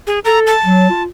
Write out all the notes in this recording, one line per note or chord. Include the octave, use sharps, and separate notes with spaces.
G#4
A4 A#5
A5
F#3
F4